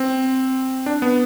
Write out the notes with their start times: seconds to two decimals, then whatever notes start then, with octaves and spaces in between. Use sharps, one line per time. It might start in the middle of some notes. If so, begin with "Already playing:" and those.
Already playing: C4
0.86 D4
1.02 B3